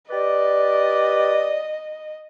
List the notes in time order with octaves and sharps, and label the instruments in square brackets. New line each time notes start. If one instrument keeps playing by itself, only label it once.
[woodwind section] G4 B4 D5 [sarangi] D#5